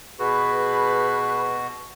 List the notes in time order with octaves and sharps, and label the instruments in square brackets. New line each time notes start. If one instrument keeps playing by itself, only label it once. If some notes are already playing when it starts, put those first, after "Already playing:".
[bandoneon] B2 F#4 [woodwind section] G#4 B4